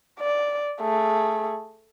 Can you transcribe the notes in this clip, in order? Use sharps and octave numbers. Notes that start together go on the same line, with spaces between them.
D5
A3 G#4